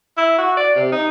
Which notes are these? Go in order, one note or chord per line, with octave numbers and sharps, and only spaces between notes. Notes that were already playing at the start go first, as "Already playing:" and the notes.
E4
F#4
D5
C3
D#4